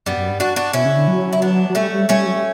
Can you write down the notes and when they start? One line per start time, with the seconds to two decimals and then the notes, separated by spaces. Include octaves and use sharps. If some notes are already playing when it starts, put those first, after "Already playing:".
0.06 F#2 G3 B3
0.17 F#2
0.29 G2
0.40 D4 F#4
0.56 D4 F#4
0.73 B2 C#4 E4
0.85 C#3
0.97 D3
1.08 F#3
1.33 E4
1.42 B3 D4
1.70 F#3
1.75 G3 A3 C#4
1.92 G3
2.09 G3 A3 C#4
2.26 F#3
2.36 G3